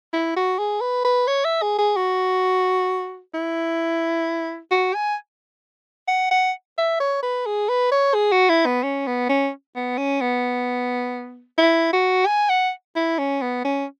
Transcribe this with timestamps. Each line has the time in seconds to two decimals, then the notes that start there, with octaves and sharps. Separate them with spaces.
0.13 E4
0.36 F#4
0.59 G#4
0.81 B4
1.05 B4
1.27 C#5
1.45 E5
1.62 G#4
1.78 G#4
1.96 F#4
3.34 E4
4.71 F#4
4.94 G#5
6.08 F#5
6.31 F#5
6.78 E5
7.00 C#5
7.22 B4
7.46 G#4
7.69 B4
7.91 C#5
8.14 G#4
8.32 F#4
8.49 E4
8.66 B3
8.83 C#4
9.07 B3
9.29 C#4
9.75 B3
9.98 C#4
10.21 B3
11.58 E4
11.93 F#4
12.26 G#5
12.49 F#5
12.96 E4
13.18 C#4
13.41 B3
13.65 C#4